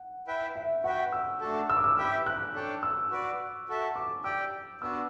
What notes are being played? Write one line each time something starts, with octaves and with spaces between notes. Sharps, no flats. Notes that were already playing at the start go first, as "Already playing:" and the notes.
Already playing: F#5
E4 B4 E5 G5
E5
F#4 B4 E5 F#5 G5
E6
A3 D4 F#4 A4
E6
D6
E6
E4 G4 B4 E5 G5 E6
F#6
D4 A4 C#5 G5
E6
F#4 B4 D5
F#4 A4 E5
D6
G4 D5 G5 E6
B3 D4 F#4 E6